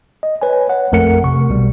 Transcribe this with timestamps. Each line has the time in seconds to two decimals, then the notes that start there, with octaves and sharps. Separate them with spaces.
0.23 D#5
0.42 B4 C#5 G#5
0.70 C#5 F#5
0.92 A#1 F2 A3 A#4 F#5 C#7
1.24 C3 C#6
1.49 B1 B2 G3